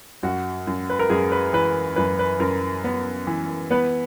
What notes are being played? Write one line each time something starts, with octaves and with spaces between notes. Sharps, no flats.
F#2 F#4
F#2
B4
A#4
F#2 G#4
B4
E3 B4
F#2 B4
B4
F#2 A#4
B3
E3
B3 B4